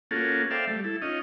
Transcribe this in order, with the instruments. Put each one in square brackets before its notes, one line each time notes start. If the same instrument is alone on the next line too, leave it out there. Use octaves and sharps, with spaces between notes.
[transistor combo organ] A#3 C#4 F4 F#4 G#4 A4
A4 C5 D5 E5 F5 G5
G3 A3
E4 A4
C#4 D#4 F4 D#5